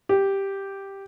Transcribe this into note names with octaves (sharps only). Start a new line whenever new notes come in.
G4